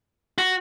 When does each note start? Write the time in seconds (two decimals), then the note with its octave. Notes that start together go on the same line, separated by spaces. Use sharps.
0.38 F#4